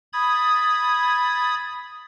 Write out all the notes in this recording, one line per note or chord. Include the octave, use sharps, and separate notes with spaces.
B5 D#6 G#6 A6